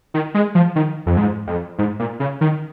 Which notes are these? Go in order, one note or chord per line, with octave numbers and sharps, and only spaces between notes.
D#3
G#3
F3
D#3
F2
G#2
F2
G#2
A#2
C#3
D#3